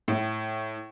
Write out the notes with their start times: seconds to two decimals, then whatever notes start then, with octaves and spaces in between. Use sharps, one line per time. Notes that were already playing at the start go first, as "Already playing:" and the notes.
0.08 A2